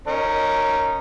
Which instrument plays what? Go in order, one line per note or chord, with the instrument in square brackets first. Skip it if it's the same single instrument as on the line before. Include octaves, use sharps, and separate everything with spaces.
[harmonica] C#4 D#4 A#4